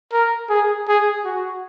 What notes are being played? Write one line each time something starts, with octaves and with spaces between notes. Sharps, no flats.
A#4
G#4
G#4
F#4